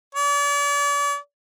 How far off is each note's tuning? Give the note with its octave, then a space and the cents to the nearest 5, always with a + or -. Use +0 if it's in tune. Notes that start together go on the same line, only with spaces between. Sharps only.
D5 -40